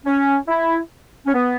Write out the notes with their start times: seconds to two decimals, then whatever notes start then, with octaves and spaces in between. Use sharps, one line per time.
0.06 C#4
0.48 E4
1.26 C#4
1.34 B3